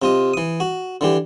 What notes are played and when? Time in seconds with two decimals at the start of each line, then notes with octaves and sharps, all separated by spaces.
0.02 C3 F4 D#5
0.34 E3 D#6
0.60 F#4
1.01 D3 E3 G4